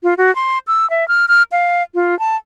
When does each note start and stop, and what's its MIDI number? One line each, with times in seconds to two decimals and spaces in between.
0.03 0.14 65
0.18 0.34 66
0.36 0.58 84
0.67 0.89 88
0.90 1.07 76
1.08 1.26 89
1.28 1.43 89
1.52 1.83 77
1.95 2.17 65
2.19 2.36 81